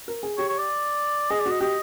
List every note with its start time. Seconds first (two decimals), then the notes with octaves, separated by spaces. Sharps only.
0.08 A#4
0.23 G#4
0.38 G4 C#5
0.49 C#5
0.58 D5
1.30 G#4 D#5
1.40 D5
1.46 F#4 D#5
1.60 G4 D#5